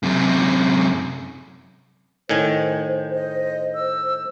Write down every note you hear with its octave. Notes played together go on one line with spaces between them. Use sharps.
F#2 C3
A2 D#3 C5 G#5
D#5
E6